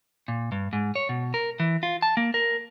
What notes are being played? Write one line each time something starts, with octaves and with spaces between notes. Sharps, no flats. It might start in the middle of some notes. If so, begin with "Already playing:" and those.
A#2
G2
G#2
C#5
B2
A#4
E3
F4
A5
A#3
A#4